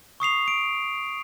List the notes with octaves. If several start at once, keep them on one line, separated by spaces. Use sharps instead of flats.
C#6 D#6 C7 F7
D7